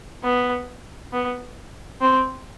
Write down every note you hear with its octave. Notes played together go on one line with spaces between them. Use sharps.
B3
B3
C4